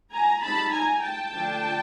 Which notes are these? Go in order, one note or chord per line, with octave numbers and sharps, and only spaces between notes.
G#5 A#5
G3 C4 D#4 A5 B5
G#5 A#5
G5 A5
D3 F3 A3 D4